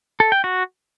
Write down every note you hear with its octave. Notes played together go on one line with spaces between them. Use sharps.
A4
G5
F#4